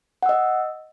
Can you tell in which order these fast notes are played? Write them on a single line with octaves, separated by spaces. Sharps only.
F#5 E6 D#5